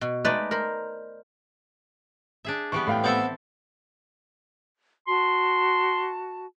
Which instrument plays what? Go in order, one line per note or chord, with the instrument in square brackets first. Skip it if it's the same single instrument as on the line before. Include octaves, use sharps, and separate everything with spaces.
[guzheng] B2
G#3 A3 D#4 B4 D5
A#4 C5 B5
[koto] D4 G#4 E5
[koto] E3 G3 B3 [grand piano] C#6
[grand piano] A2 F5 G5
[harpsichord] B3 C5 E5 [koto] C4 E4 A4
[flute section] F#4 A5 [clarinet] C6